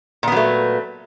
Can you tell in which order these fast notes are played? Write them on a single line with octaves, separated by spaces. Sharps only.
A#2 B3 F#3 A3